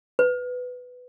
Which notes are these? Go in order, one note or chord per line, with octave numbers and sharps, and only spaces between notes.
B4